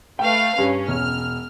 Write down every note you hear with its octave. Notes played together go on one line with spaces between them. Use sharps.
A3 B4 F5 G5
G2 C#4
E1 F6